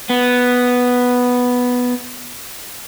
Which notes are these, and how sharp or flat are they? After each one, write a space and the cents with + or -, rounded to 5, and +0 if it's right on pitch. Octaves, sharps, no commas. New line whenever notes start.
B3 +0